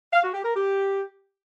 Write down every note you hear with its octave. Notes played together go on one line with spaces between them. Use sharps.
F5
F#4
G4
A#4
G4